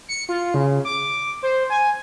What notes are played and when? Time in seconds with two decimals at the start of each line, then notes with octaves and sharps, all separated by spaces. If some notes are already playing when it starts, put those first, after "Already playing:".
0.08 C#7
0.29 F4
0.54 C#3
0.85 D6
1.43 C5
1.70 G#5